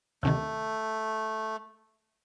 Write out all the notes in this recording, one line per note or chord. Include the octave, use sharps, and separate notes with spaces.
D2 C3 D#3 A3